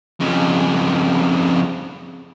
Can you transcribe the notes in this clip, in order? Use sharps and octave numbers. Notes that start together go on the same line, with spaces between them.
F2 C#3